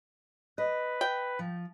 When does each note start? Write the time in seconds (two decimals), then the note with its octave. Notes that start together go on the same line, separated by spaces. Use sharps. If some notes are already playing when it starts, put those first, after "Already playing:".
0.58 B4 D#5
1.01 G5
1.39 F3